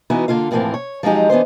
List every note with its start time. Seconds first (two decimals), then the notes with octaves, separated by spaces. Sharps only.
0.10 E3 B3 D#4 E4 F#4
0.28 D3 A#3 F4 F5
0.51 D#2 A2 E3 F3 A#3 C4
0.74 C#5
1.03 F3 F#3 G#3 D#4 G4
1.30 E3 B3 D4 C5